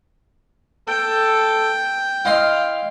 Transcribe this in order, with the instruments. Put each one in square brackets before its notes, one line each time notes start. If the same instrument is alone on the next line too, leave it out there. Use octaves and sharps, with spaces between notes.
[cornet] A4 [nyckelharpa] G5
[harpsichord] E4 D#5 C6 [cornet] F5